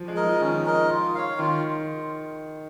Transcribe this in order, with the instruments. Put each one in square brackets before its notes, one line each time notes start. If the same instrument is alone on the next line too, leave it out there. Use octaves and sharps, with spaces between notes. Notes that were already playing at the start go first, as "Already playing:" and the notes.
Already playing: [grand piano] F3
G#3
[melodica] A#4 D#5
[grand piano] F3
[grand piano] D#3 [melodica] C#4
[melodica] A#4 D#5
F4
C#5 F5
[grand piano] D#3 [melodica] F4